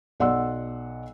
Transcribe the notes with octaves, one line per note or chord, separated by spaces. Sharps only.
B1 D5 F#5 C6 E6